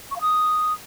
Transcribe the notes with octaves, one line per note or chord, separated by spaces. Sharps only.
C#6
F5
D#6